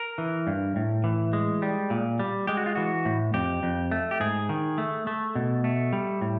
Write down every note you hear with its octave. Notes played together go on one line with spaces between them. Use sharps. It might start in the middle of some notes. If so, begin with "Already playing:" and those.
Already playing: A#4
E3
G2
A2
E3
G#3
G3
A#2
G3
G#3 G4
F#4
F4
E3 F#4
A2
F2 G4
F2
A3
G4
G#2 G#4
D#3
A3
A3
B2
A3
G3
A2